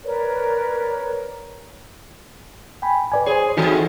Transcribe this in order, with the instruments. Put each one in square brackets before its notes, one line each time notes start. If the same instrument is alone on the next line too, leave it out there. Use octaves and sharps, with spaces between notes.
[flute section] A#4 B4 C#5 D5
[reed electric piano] G5 G#5 B5
B4 D5 G#5
[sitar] G#4 [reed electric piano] C5 C#5
[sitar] A2 E3 C4 [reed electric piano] D#4 F#4 A4